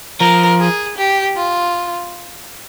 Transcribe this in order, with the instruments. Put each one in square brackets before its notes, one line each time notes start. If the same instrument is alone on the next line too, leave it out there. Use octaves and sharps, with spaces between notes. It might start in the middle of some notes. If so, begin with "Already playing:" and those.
[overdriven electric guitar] F3 [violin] A#4
[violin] G#4
G4
F4